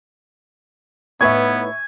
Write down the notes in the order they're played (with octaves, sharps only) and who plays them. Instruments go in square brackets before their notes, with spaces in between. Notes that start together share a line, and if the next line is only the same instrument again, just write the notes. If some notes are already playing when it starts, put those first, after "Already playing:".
[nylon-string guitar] A2 D#4 B4 [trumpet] B3 [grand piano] E5 C#6 [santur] G#5